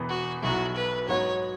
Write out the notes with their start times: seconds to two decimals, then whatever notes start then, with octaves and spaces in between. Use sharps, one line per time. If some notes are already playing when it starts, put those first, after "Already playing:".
Already playing: E1 E2 E3 B3
0.09 F#4
0.42 B1 B2 F#3 E4 F#4
0.76 B4
1.08 G#2 F#3 B3 F#4 C#5